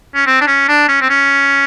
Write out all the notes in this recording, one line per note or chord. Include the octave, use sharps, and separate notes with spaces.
C#4
C4
D4
C#4
D4
C#4
C4
C#4